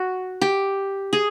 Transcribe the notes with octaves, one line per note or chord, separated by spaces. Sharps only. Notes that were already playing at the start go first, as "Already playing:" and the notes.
Already playing: F#4
G4
G#4